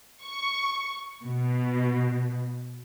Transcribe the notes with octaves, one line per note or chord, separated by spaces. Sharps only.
C#6
B2